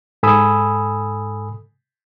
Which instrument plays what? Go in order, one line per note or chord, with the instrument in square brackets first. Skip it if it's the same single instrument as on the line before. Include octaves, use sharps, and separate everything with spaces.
[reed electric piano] G#2 A4 G#5 B5 D#6 E6